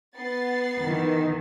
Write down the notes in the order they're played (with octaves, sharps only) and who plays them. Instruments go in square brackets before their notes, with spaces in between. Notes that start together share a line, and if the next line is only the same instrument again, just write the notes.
[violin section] B3 A6 C7
[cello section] D#3 E3